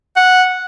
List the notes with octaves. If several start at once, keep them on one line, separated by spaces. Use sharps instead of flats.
F#5